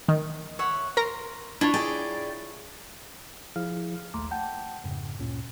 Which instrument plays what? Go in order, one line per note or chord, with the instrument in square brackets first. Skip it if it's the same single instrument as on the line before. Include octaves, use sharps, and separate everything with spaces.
[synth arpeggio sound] D#3
[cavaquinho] C#5 E5 F#5
[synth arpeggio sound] A#4 A#5 [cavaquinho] C6
[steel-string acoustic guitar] D4 [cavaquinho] E4 F4 C#5
[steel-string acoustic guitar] G#4 D5 G5
[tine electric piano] F3 E4 G#4 F5 F6
A#1 D#2 A3 A#5 C6 D6
F#5 G5 A5 G6
F2 G#2 C#3
D2 G2 A#2 C#4